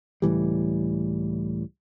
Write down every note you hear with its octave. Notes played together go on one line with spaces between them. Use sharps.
C#2 A2 E3 G3